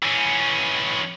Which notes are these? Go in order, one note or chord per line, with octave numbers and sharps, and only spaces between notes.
E3 C#4